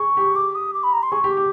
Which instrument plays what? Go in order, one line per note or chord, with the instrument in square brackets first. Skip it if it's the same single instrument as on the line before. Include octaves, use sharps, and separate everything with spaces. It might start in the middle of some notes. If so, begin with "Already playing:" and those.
Already playing: [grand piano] G#4 [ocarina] C#6
[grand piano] G4
[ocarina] D6
D#6
D6
B5
A#5
C6
[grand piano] G#4 [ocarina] C#6
[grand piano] G4
[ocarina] D6
[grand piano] G4